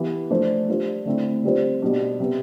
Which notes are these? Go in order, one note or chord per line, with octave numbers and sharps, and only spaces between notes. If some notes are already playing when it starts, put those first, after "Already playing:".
Already playing: E3 B3 E4 G4
F3 A3 D4 A4 C5
G3 D4 F4 C5
D3 A3 C4 E4
D3 G3 C4 F4 C5
B2 G3 D4
C3 G3 B3